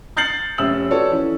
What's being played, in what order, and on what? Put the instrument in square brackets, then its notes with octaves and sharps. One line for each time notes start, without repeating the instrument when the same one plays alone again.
[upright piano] F6 G6 A6 C7 C#7 F#7
F1 C#4 E5 E6 F#7
F3 F#4 A4 B4 C#5 D5
E3 C#4